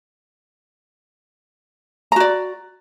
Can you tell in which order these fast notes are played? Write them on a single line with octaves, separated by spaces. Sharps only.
A#5 F#4 D5